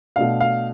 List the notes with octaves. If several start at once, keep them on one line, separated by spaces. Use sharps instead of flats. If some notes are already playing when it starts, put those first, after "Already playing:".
B2 A3 D4 F5
F5